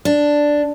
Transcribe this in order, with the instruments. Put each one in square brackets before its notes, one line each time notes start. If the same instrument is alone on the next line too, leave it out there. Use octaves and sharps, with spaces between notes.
[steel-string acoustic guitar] D4